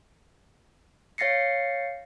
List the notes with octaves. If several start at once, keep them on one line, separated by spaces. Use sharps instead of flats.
C#5 F5 A6 A#6 C7 C#7